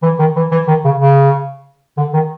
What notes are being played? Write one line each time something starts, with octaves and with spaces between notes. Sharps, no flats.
E3
D#3
E3
E3
D#3
C#3
C#3
D3
D#3